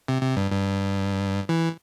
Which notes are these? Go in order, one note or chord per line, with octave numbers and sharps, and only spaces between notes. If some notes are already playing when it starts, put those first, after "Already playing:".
C3
C3
G2
G2
E3